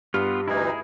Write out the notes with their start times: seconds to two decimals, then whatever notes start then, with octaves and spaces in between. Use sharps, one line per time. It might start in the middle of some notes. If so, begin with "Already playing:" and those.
0.14 G2 B3 F4 G4 F6
0.48 D2 E3 D#4 E4 G#4